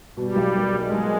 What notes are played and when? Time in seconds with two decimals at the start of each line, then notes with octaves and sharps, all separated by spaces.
0.17 B2 G3
0.36 B1
0.55 A#3
0.74 G#3 A#3
0.93 B1